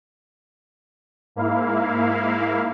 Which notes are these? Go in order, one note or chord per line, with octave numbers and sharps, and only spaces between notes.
G#2 A#3 E4 F5